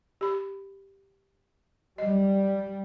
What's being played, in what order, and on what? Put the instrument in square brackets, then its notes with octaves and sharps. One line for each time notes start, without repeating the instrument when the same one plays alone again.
[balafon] G4 B5
[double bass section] G3 [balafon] D#5